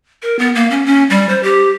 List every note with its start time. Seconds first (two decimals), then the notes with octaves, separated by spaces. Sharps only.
0.22 A#4
0.39 B3
0.55 A#3
0.71 C#4
0.86 C#4
1.10 G3
1.29 C5
1.43 G4